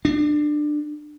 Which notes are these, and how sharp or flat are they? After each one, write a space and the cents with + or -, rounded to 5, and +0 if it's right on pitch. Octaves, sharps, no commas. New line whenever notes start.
D4 +20